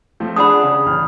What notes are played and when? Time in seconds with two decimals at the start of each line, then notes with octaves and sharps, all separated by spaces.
0.20 F3 A3 C4
0.36 D4 G#4 F#5 B5 D#6
0.63 C#3
0.85 D#1 A1 F6